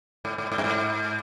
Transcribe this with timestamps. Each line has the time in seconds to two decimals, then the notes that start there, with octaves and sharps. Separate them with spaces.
0.25 G#2
0.38 G#2
0.52 G#2
0.58 G2
0.64 G#2